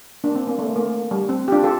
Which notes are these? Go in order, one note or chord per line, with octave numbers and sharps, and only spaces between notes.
A#3 D4
C4
A#3
A3
A#3
G3
C4
G4
D4 F4
F4 A4